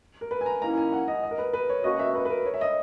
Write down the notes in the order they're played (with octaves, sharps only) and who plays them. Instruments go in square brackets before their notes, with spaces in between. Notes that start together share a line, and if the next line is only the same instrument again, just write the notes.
[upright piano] A#4
B4
G#5
A#5
[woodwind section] D#3 A#3 C#4 E4 [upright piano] A#5
[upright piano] G#5
F#5
D#5
D#5
A#4
B4
B4
C#5
[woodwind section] B2 A#3 C#4 F#4 [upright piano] D#5
[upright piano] E5
B4
B4
A#4
C#5
E5
D#5